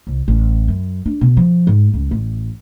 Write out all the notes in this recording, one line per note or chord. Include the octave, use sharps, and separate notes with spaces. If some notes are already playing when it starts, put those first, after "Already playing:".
C2
A1
F#2
D4
B2
F3
G#2
C#2
A1